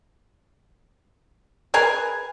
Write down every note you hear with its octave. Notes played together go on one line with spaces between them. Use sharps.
G#4 A#4 B4 G#5